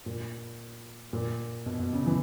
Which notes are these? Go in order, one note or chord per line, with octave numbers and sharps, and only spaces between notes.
A#2
A#2
B2
B2
C#3
E3